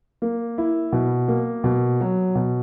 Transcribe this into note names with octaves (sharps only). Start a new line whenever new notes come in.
A#3
E4
B2
A#3
B2
F#3
B2